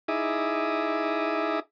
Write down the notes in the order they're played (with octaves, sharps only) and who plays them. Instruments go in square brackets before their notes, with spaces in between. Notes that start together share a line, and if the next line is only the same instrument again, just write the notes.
[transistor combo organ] D#4 E4 G#4 E5 D6 D#6